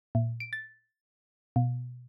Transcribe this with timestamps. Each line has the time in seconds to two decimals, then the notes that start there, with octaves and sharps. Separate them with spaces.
0.15 A#2
0.40 D7
0.53 A6
1.56 B2